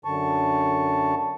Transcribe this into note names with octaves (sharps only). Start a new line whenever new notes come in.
F#2 D3 A5 C#6